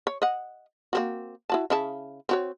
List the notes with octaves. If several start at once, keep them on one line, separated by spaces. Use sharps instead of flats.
C#5
D#5 F#5
A#3 C4 F#4
E4 F#4 A5
C#3 E4 A5
C4 F#4 C#5